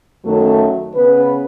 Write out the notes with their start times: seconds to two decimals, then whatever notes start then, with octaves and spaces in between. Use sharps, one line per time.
0.25 F#2 D#3 F#3 A3
0.95 C#3 B3 B4